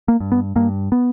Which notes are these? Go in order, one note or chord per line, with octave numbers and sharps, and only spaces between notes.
A#3
G2
B3
G2 A#3
B3